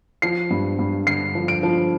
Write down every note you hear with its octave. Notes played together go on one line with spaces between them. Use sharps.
F3 C7
G2
G2
D3 C7
F3
D7
F3